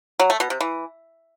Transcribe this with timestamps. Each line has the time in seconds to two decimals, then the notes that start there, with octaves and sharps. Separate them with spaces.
0.19 F#3
0.30 A3
0.40 B2
0.50 C3
0.60 E3